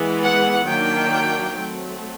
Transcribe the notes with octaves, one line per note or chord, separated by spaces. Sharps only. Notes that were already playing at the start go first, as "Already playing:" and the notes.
Already playing: E3 G#3 B3
F#5
D#3 F#3 A#3 D4 G5
F#3 A3 C4